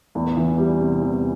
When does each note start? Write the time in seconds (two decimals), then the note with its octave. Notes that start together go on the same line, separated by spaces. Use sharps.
0.15 E2
0.37 E3
0.58 G3
0.80 C3
1.02 E2